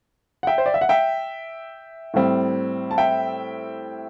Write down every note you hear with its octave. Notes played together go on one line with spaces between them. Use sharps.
F#5
E5 G5
C5
D5
E5
F#5
E5 G5
A2 G3 C4
A5
E5 G5